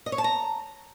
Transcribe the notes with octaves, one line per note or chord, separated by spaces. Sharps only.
D#5
C#5
A5
A#5